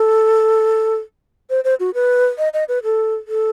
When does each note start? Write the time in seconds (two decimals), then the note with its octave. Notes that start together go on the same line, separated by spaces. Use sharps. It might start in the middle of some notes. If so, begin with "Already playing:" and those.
Already playing: A4
1.50 C5
1.64 C5
1.80 F#4
1.94 B4
2.38 D#5
2.54 D#5
2.69 B4
2.84 A4
3.28 A4